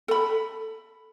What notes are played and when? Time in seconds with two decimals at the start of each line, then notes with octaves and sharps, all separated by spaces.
0.08 A4 B5